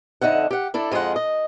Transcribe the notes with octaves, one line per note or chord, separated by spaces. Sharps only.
F2 D3 D#4 E5 F#5
G4 F#5
D4 E4 A4
F2 G#3 F4 G#4 F#5
D#5